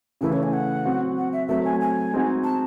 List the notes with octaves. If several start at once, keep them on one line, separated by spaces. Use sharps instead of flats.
C#3 E3 A3 E4
C#5
G#5
F#5
F#3 C4 F#4
F#5
E5
F#3 A3 C4 E5
G#5
G#5
G#3 C4 D#4 F#4
A5